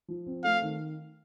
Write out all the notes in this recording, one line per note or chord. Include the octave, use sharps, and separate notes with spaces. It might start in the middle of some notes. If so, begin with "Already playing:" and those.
F3
C4
A3 F5
D#3